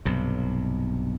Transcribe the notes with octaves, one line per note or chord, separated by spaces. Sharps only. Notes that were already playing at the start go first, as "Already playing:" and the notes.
B1 G2 C3